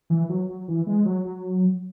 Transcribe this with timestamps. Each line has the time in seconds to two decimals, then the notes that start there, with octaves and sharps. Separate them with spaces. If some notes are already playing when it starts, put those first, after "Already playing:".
0.10 E3
0.29 F#3
0.49 F#3
0.68 E3
0.87 G#3
1.05 F#3
1.25 F#3